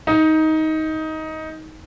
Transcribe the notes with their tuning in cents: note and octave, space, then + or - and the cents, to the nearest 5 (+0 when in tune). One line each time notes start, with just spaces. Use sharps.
D#4 +15